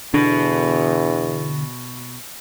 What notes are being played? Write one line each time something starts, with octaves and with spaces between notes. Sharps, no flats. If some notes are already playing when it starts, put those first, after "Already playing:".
E2 B2 D3